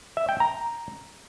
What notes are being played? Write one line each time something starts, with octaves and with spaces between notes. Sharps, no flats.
E5
G5
A#5